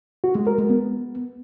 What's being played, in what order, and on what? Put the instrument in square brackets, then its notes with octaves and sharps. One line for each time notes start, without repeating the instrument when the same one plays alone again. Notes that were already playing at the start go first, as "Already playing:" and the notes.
[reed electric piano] F#4
G#3
A#4
G#3
B3